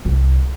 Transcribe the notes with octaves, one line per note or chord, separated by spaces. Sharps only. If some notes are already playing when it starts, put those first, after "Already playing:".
C2